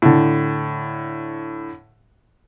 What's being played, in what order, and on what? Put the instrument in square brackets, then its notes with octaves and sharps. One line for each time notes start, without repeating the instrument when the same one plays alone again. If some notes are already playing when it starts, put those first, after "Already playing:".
[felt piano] A2 D3